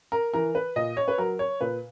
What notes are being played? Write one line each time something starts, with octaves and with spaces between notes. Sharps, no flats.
A#4
E3 A#4
B4
A#2 D#5
C#5
B4
F#3 A#4
C#5
A#2 B4